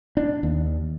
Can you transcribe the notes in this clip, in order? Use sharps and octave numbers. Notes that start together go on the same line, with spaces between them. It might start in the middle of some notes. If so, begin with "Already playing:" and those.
D4
D#2